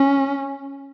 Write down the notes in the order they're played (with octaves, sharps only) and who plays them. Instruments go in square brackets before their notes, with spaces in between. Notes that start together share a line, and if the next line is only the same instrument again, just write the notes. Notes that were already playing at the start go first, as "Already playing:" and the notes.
Already playing: [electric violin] C#4